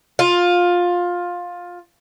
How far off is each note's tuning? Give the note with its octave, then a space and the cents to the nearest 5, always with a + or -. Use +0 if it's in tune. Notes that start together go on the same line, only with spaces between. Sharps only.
F4 +15